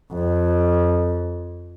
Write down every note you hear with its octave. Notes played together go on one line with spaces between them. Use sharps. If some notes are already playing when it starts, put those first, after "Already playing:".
F2